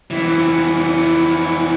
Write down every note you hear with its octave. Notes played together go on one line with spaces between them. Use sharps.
F2 E3